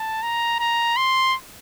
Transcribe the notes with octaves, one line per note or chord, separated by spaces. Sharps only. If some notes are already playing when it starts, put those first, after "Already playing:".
Already playing: A5
A#5
A#5
C6